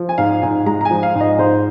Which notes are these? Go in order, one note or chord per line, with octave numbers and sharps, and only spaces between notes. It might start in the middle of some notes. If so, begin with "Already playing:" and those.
Already playing: F3
G#5
G#2 F5
G#2 G#5
G#3 A#5
A#5
G#5
F3
F5
G#2
D#5
G#2 C5